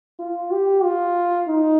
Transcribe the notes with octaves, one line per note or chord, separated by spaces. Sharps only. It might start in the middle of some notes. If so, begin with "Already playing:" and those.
F4
G4
F4
D#4